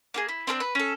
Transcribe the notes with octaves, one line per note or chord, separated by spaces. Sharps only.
A#3 F4 G#4
E4
C4 D4 A4 C5
B4
C#4 A4